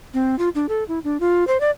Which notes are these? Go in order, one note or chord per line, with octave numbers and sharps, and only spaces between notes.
C4
F4
D4
A4
E4
D4
F4
C5
D5